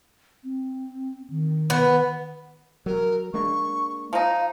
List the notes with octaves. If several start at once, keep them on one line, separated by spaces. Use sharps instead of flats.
C4
D#3
B3
F#3 A#4
G#3 A#3 D4 C#6
F3 D#4 F5